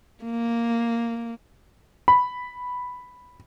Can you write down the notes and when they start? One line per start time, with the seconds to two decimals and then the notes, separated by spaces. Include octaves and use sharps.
0.24 A#3
2.08 B5